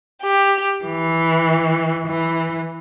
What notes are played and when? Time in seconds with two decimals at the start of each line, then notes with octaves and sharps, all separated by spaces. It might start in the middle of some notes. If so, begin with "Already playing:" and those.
0.22 G4
0.84 E3
2.06 E3